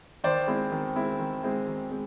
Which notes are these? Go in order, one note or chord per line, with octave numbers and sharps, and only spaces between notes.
D#3 C5 D5
G#3 C4 E4
D#3
G#3 C4 E4
D#3
G#3 C4 E4
D#3
G#3 C4